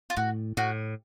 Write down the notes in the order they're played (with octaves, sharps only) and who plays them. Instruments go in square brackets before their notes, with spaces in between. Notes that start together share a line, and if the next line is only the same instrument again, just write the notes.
[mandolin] F4
[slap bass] A2 [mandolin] F#4
[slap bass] A2 [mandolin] F#4